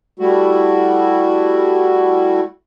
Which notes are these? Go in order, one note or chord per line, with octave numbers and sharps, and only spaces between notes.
G3 A3 E4 F#4